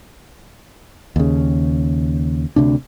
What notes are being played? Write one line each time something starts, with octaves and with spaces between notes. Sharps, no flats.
D#2 C#3
D2 C3 D4